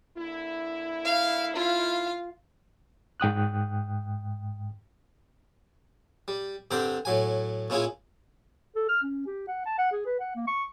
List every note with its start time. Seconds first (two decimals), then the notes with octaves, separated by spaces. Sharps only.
0.17 D3 A#3 E4
1.05 F5
1.56 F4 F5
3.20 G#2 G5 D#6 F#6
6.28 G3
6.71 G2 D3 C4 A#4 C5 D6
7.05 A2 F#3 G#5
7.70 A#2 C#4 E4 F4 G#4
8.75 A4
8.89 F6
9.02 C#4
9.26 G4
9.48 F#5
9.66 A5
9.78 F#5
9.92 G#4
10.06 B4
10.20 F#5
10.36 A#3
10.47 C#6